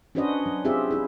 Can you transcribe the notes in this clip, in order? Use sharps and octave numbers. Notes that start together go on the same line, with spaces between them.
C#4 D4 F#4 B4 C5 D#5
F#3
C4 F4 G4 G#4 E5
E4 G#4